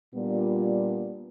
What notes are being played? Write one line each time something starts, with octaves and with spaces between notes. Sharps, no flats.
A#2 G3 B3 D4 F4